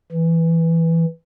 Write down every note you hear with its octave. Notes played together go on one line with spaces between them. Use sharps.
E3